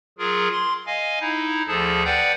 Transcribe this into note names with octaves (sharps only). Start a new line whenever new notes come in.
F#3 F4 G#4 A#4
C6
D#5 F5 G#5
D#4 E4
D2 F3 G#4 A4 A5
B4 D5 F#5 G5 G6